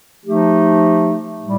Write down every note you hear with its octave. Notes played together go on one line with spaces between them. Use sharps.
F3 A3 D#4 G4
A2 G3